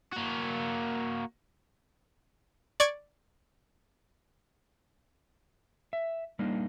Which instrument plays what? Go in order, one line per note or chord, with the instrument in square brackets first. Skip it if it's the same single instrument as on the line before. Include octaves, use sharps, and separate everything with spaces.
[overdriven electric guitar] A#3 F#4
[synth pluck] D5 C#6 G#6 D7
[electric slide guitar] E5
G3 A#3 D4 D#4